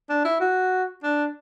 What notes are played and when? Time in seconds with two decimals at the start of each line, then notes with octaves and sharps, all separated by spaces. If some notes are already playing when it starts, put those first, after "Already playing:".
0.09 D4
0.25 E4
0.40 F#4
1.03 D4